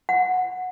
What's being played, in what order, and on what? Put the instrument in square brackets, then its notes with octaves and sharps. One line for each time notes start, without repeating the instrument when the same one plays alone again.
[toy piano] F#5